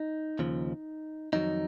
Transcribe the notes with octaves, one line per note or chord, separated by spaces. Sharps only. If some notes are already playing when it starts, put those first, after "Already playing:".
Already playing: D#4
D#2 C#3 F3
F2 D#3 F#3 D#4